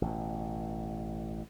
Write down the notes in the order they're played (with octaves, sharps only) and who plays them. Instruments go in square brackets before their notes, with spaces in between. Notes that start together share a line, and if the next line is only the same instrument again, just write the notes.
[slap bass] A1 B2